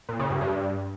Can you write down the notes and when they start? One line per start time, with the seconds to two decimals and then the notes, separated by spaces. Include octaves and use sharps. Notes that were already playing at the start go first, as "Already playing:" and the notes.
0.09 A#2
0.19 C#3
0.30 G2
0.41 G2